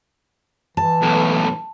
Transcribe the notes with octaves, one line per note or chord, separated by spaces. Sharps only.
E3 A5
B1 A2